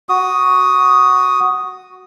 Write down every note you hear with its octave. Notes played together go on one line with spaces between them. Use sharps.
F#4 D#6